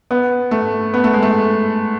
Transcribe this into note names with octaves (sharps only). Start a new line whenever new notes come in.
B3
A3
B3
A3
G#3
A3